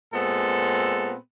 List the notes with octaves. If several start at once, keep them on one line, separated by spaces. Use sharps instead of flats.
A#2 G#3 B3 C4 A4